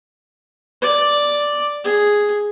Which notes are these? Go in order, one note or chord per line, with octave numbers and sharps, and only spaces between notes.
D5
G#4